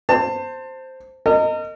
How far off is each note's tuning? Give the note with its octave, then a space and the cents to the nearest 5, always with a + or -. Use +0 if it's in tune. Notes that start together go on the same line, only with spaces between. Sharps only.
C5 +0 A5 +30
A#4 -40 D#5 +0